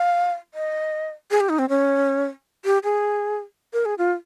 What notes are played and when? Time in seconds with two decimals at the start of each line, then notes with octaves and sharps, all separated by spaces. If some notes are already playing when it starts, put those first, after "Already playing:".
Already playing: F5
0.54 D#5
1.31 G#4
1.41 G4
1.49 D#4
1.59 C4
1.69 C#4
2.65 G4
2.84 G#4
3.73 A#4
3.86 G#4
3.98 F4